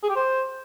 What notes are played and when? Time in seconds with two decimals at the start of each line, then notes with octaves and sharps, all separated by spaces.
0.03 G#4
0.09 G4
0.16 C5